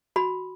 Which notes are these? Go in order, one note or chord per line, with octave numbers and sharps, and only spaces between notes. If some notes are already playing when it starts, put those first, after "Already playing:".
F#4 B5